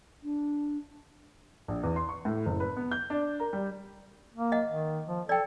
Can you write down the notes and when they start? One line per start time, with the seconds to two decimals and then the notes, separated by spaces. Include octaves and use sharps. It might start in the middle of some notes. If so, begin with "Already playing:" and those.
0.23 D4
1.68 A#1
1.83 E2
1.96 C6
2.09 C#6
2.25 A2
2.46 F#1
2.60 B4
2.77 B3
2.91 G6
3.10 D4
3.40 A#4
3.53 G3
4.35 A#3
4.52 D#5 F#5
4.68 D#3
5.07 F3
5.29 A4 D5 G5